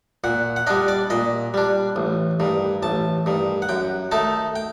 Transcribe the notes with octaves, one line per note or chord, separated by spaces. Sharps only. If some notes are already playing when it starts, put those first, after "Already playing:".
A#2 F#5
F#5
G3 D4 D#5
D5
A#2 D#5
G3 D4
A1
G2 D#3
A1 A5
G2 D#3
F#5
F#2 G5
D#3 A3 D#4 A5
G5